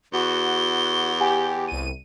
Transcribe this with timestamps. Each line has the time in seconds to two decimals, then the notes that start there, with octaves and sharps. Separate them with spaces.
0.13 E2 F#4 G7
1.20 G4 F#5 G#5
1.68 C2 D#7